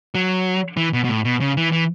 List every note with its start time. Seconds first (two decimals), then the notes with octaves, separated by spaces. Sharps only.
0.15 F#3
0.77 E3
0.93 B2
1.04 B2
1.09 A2
1.25 B2
1.41 C#3
1.57 E3
1.72 E3